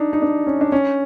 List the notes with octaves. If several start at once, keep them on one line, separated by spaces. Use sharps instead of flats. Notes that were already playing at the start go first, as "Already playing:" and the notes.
Already playing: D4 D#4
D#4
D4
C#4
D4
C#4